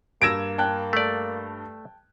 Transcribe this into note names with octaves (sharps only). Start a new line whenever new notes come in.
G2 A#3 E6 G#6 A#6 D7 E7
G5 A5 F#6
A3 D5